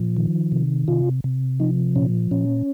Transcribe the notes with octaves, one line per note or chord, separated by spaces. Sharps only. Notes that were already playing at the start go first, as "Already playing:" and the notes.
Already playing: A#2 F3
D#3
C3
C3 F4
C3
F3 D#4
A#2 C#4
A#2 C#4